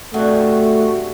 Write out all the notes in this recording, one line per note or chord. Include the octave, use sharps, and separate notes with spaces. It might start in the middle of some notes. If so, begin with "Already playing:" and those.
G2 C3 A3 F#4